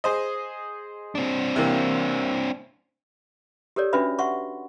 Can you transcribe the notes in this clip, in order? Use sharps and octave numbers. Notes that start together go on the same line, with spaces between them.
G#4 C5 D#5
C4 D4
C3 E3 A#3
G4 A4 A#4 C#5 D5
C#4 D4 F#4 B4 E5 B5
E5 F#5 C6 C#6